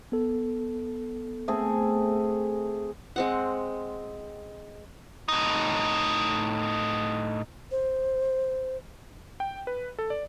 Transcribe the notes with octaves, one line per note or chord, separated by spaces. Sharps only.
B3 A4
A3 C4 G#4
G#3 C4 F#5
A2 D#4
C5
G5
B4
A4
D5